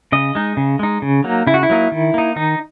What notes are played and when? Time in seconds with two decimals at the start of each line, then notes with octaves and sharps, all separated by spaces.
0.12 C#3 D#5
0.35 G#3 D#4
0.57 C#3
0.79 G#3 D#4
1.02 C#3
1.24 F#3 A#3 D#4
1.47 C#3 E4
1.54 F#4
1.63 E4
1.70 F#3 A#3 D#4
1.92 D#3
2.14 A#3 D#4
2.36 D#3 D#4